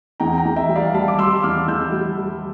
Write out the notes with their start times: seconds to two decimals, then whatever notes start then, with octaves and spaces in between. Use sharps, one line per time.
0.20 E2 G5 A#5
0.38 G5 A#5
0.45 E2
0.56 E5 G5
0.69 G3
0.76 D5 F5
0.94 G3 F5 A5
1.08 D6
1.18 G3 C6 E6
1.43 E2 D6 F6
1.67 E2 E6 G6
1.92 G3
2.18 G3